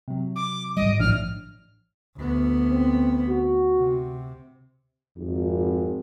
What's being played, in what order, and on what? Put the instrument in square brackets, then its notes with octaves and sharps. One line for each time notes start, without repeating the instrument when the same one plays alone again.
[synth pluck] C3 F#3
[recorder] D6
[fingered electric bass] G#1 C#2 G3 [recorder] D#5 [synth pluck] D7
[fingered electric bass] A#1 F3 [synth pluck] A2 D4 [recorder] F6
[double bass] D2 B3
[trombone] C4
F#4
[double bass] C3
[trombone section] G#1 [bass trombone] F2